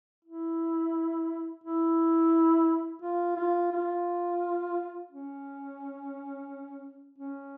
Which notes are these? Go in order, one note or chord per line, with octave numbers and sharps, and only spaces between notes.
E4
E4
F4
F4
F4
C#4
C#4